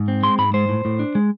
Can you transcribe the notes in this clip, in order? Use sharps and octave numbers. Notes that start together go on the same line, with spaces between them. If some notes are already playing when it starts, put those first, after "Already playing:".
Already playing: G#2
C4
G#3 C6
G#2 B5
G#3 C5
A2
A2
D4
G#3